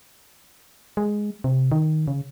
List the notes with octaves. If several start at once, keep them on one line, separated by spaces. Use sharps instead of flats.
G#3
C3
D#3
C#3